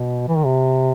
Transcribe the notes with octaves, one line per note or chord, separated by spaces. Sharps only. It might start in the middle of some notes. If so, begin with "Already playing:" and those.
Already playing: B2
E3
D#3
C3